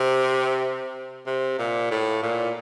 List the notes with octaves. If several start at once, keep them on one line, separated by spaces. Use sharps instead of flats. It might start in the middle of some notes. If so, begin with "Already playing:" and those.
Already playing: C3
C3
A#2
A2
A#2